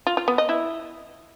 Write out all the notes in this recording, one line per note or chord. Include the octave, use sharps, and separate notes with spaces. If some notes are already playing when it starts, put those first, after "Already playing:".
F4
F4
B3
D#5
E4